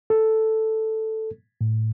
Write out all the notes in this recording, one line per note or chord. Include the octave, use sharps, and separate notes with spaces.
A4
A2